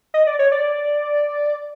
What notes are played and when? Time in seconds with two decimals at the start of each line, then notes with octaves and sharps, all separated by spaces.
0.14 D#5
0.27 D5
0.39 C#5
0.52 D5